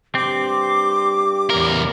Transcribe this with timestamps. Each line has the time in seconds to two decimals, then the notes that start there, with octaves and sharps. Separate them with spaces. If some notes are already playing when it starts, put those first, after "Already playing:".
0.15 G2 C4 G4 D6
1.50 E2 A#4